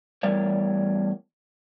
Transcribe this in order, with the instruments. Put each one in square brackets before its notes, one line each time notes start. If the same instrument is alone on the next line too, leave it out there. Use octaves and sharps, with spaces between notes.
[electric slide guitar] E2 A2 G3 A#4 C#5 D5